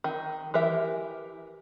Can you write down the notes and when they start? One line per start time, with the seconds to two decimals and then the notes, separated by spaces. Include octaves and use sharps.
0.04 D#3
0.54 E3 G4 A#4 E5